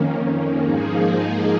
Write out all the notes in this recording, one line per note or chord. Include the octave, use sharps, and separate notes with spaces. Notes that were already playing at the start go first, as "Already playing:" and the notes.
Already playing: F2 D#3 A#3 C#4
G#2 F3 A#3 D#4 G#4